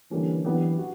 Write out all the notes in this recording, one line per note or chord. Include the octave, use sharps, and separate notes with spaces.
D3 E3 G3 A#3 C#4
E3 F#3 B3 D4 G4
F#4